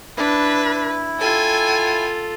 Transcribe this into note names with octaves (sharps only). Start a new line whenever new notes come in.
D4 E4 B4
F4 A4 G5 G#5